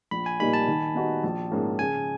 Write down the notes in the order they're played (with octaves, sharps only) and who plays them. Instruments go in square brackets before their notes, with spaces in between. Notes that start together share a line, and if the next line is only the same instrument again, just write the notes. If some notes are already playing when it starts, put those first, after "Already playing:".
[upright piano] A#1 [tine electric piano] B5
[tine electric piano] G#5
[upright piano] A#2 G3 A#3 D#4 [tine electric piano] B5
[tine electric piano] A5
[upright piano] D#3
G3 B3 D#4 F#4
A#1
G#2 F3 A#3 C#4
[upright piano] C#3 [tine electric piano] G#5